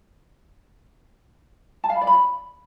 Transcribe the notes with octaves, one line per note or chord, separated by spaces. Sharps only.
A5
F5
B5
D5
B5